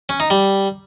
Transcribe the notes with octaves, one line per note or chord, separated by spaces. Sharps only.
C#4
D#4
G3